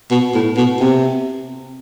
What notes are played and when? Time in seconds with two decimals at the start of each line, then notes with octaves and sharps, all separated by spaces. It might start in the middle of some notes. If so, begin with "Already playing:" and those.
0.11 B2
0.34 A2
0.57 B2
0.80 C3